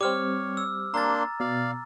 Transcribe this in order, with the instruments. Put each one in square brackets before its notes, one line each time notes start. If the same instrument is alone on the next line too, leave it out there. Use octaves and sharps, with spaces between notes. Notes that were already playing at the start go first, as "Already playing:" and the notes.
[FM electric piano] G3 C4 [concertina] C#5 [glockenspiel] D6 F6
[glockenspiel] E6
[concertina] A#3 D4 C6 [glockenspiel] A#5 A6
[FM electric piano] B2 [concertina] D5 F5